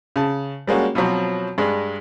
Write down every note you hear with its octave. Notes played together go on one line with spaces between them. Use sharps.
C#3 A5
G3 G#3 A#3 C#4 F#4
B2 F3 F#3 C4
G2 G#3 D4